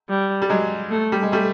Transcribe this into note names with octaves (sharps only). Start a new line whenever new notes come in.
G3
G3
F#3 G#3
A3
G3
G#3
G3 A3